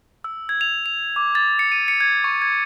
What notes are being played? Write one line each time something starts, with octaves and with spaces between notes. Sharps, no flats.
E6
G#6
F7
F7
D6
A6
C#7
D#7
C#7
G#6
C#6
G#6